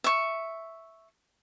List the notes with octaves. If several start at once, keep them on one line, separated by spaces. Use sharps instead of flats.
E5 C#6